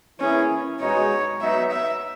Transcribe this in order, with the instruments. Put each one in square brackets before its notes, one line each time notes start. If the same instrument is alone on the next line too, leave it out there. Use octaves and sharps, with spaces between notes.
[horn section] E3 A#3 E4 G#4 [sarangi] C#4
[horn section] B2 G#3 D#4 [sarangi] C#5
[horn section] F#3 B3 D#4 [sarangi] E5
[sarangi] E5